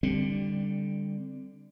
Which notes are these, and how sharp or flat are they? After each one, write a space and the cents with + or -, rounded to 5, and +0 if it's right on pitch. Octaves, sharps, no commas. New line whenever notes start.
D3 +0 G3 +15 C4 +0